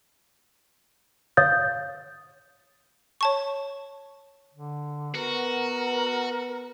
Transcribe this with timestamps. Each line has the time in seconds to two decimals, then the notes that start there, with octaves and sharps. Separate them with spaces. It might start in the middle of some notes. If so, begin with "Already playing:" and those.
1.37 C#5 F5 D#6 G6 A6
3.21 C#5 A5 C#6
4.54 D3
5.14 B3 F#4 A#4